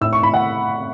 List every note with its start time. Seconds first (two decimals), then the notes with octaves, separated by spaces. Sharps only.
0.01 A2 E6
0.13 C#6
0.22 A2 B5
0.34 F#5